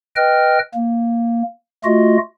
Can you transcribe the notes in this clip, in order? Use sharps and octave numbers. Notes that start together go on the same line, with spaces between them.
B4 D#5 G5 F6
A#3
A3 F4 F#4 D#5